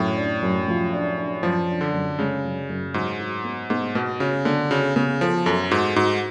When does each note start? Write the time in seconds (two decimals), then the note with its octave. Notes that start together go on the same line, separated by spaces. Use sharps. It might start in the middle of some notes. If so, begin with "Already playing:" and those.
Already playing: F#2 A2
0.17 D4
0.43 F#2
0.68 F3
0.93 D4
1.18 D4
1.43 F#2 F3
1.68 D4
1.81 D3
1.93 F#2
2.19 C#3 G#3
2.44 F#2
2.69 F#2
2.94 G#2 F#3
3.19 F#4
3.45 B3
3.70 G#2 B3
3.95 B2 B3
4.20 C#3 F#4
4.45 D3 B3
4.70 C#3 F#4
4.96 C#3 B3
5.21 F3 A4
5.46 F#2 A4
5.71 G#2 F#4
5.96 G#2 F#4